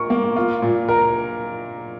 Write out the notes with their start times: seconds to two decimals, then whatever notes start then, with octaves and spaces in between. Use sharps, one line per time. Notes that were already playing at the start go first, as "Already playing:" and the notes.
Already playing: A#2 A#4 C#6
0.10 A#3
0.36 F4
0.62 A#2
0.89 A#4 A#5